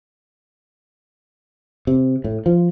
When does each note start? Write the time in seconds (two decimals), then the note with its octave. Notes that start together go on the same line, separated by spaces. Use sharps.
1.87 C3
2.24 A2
2.46 F3